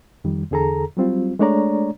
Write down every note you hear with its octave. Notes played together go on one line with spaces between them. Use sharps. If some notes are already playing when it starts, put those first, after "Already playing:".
F2 D#3 G3
E2 D3 G#4 A4 A#5
F#3 G3 C4 F4
G#3 A3 D4 C#5 D5 A#5